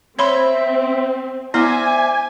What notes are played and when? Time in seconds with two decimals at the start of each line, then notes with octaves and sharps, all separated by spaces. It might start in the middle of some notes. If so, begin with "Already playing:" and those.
0.19 C4 C#5 E5 B5 C6
1.54 B3 E4 C5 D5 E5 G#5